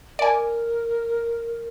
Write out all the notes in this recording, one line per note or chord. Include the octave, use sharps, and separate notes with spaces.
A#4 D5 G#5